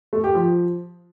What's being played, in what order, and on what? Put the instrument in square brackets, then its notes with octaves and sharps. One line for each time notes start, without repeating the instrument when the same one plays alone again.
[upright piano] A3
G4
F3